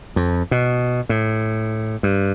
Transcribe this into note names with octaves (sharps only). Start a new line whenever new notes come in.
F2
B2
A2
G2